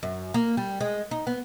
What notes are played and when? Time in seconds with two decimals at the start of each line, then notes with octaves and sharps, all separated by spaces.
0.03 F#2
0.34 A#3
0.57 G3
0.80 G#3
1.11 D#4
1.27 B3